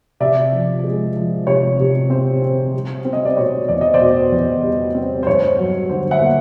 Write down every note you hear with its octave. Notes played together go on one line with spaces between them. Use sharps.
C3 D5 E5
F3
G#3
F3
C3 C#5
C3
C4 C5
C4
G3
C4
D#5
D5
B2 C#5
E2 D5
D#5
C5 D5
B2
E2
G3
C4
C5
G2 C#5
F#3
D3 C5
E5 F#5
A#3